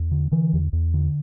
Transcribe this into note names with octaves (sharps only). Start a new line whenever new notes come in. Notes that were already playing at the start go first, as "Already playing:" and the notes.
Already playing: E2
D3
D3 E3
E2
E2
D3